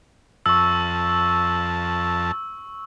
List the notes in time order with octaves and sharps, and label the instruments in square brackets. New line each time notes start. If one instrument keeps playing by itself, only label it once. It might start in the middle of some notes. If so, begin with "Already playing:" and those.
[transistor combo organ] F2 A5 [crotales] C#6 E6